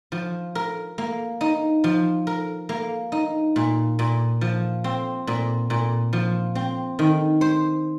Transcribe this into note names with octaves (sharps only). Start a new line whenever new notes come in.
F3
A#4
A#3
D#4
F3
A#4
A#3
D#4
A#2
A#2
F3
C4
A#2
A#2
F3
C4
D#3
C5